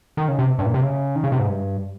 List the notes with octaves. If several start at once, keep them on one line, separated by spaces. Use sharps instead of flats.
D#3
C#3
C3
G2
A#2
C3
C#3
D#3
C#3
C3
G#2
G2